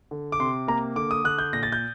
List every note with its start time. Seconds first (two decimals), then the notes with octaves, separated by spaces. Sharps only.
0.11 D3
0.32 D6
0.39 C3 C6
0.68 A#3 A#5
0.96 D3 D6
1.11 D#6
1.24 D3 F#6
1.39 G6
1.53 A#2 A#6
1.63 A6
1.72 G6